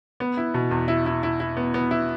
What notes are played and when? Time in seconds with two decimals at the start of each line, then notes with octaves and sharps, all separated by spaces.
0.20 B3
0.37 E4
0.54 B2
0.71 E2
0.88 E4
1.06 E4
1.23 E4
1.40 E4
1.57 B3
1.74 B3
1.91 E4